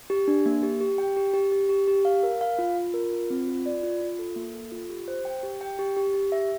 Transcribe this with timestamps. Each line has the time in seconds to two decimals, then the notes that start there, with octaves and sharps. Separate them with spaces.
0.10 G4
0.28 D4
0.46 A#3
0.63 G4
0.81 G4
0.98 G5
1.17 G4
1.34 G4
1.52 G4
1.69 G4
1.88 G4
2.05 F5
2.23 A#4
2.41 F5
2.59 F4
2.77 F4
2.94 A#4
3.12 F4
3.30 C4
3.48 F4
3.66 D5
3.83 F4
4.01 F4
4.19 A4
4.36 A#3
4.54 A4
4.72 F4
4.90 G4
5.08 C5
5.25 G5
5.43 G4
5.61 G5
5.79 G4
5.96 G4
6.14 G4
6.32 E5